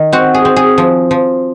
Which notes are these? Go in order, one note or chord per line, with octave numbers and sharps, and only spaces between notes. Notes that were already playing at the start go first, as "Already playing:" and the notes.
Already playing: D#3
C4 F#4
G#4
C4
G#4
F3
F3